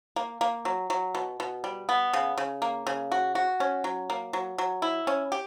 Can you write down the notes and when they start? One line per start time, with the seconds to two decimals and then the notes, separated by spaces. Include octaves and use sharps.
0.16 A#3
0.41 A#3
0.65 F#3
0.90 F#3
1.15 B2
1.40 B2
1.64 G3
1.89 B3
2.14 C#3
2.38 C#3
2.62 A#3
2.87 C#3
3.12 F#4
3.35 F#4
3.60 C#4
3.84 F#3
4.10 A#3
4.33 F#3
4.58 F#3
4.82 E4
5.07 C#4
5.32 G4